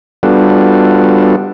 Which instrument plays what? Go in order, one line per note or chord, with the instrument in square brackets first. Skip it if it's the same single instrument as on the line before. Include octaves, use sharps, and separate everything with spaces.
[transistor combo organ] G3 B3 D4 F4 F#4 A4